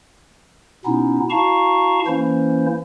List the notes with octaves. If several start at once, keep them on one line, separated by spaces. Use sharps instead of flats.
B2 B3 C#4 D#4 E4
E4 F#4 F5 A5 A#5 C#6
E3 A#3 C#4 E4 C5